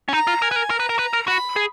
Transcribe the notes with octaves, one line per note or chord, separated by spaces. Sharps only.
C#4
D#4 A#5
F4
A#4 G#5
B4
A#4
A#4 A#5
B4
A#4
B4
A#4
F#4 B5
G#4